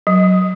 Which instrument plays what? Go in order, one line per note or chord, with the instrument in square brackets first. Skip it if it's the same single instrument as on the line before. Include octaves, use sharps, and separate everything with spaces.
[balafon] F#3